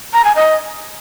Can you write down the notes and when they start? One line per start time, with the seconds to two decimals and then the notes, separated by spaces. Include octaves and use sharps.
0.14 A#5
0.25 G#5
0.36 D#5